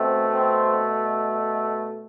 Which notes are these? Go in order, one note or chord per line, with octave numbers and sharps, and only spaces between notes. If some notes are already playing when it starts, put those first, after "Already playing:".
Already playing: B2 A3 C4
C4